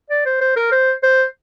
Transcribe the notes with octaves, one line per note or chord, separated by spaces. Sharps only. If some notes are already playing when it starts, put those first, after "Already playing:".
D5
C5
C5
A#4
C5
C5